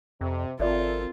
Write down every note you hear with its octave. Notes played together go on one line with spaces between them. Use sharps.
F2 C3
G#1 F3 C4 F4 A4 A#4 D5 E5